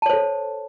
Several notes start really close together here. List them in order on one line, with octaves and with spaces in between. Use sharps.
A5 C#5 C5 A4